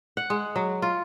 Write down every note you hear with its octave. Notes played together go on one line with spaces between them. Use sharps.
F#5
G#3
F#3
F4